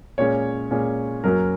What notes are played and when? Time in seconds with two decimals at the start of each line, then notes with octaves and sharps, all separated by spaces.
0.18 A#2 G#3 C#4 C#5
0.71 A#2 G#3 C#4
1.24 F#2 F#3 A#3 C#4 A#4